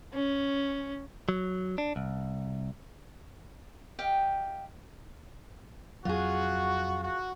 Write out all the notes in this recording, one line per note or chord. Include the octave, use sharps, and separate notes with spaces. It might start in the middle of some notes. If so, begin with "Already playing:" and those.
C#4
F#3
D4
C2
G4 D#5 F5 G5
F2 F#3 F4 F#4 G#4
F#4